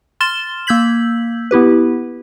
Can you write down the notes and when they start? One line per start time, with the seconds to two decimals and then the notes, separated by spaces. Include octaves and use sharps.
0.20 C6 F6 A6 E7 G7
0.67 A#3 E6 G6 G#6 B6 F#7
1.51 B3 E4 G4 B4